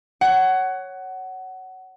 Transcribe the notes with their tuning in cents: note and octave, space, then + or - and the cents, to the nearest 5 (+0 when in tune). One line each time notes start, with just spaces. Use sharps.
C#5 +0 F#5 +20